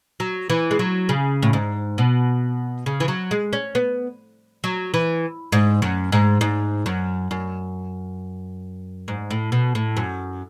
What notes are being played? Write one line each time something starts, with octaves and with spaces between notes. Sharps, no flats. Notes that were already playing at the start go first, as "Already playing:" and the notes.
F#3
E3
G#3
F#3
C#3
A2
G#2
B2
C#3
E3
F#3
G#3
C#4
B3
F#3
E3
G#2
F#2
G#2
G#2
F#2
F#2
G#2
A2
B2
A2
F#2